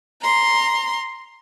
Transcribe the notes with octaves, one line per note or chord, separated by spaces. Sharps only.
A#5 C6